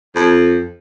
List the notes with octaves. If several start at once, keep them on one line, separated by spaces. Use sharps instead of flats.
F2